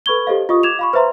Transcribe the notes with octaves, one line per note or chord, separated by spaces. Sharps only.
A4 B4 B5 C#6 G#6 G7
G4 A4 C5 D#5 F5
F4 D#5 C#6 D#6
D6 G#6 E7 F7
F5 B5 C#6
B4 C5 E5 A#5 C6